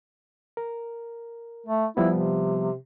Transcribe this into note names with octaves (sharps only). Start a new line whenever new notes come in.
A#4
A3
F3 G3 B3 E4
C3